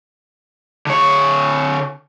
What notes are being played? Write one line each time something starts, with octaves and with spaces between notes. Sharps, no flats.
D3 C#5